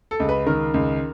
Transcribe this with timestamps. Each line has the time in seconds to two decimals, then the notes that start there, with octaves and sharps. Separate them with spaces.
0.11 A4
0.20 C#2
0.29 B4
0.46 D#3 A#4
0.74 C#2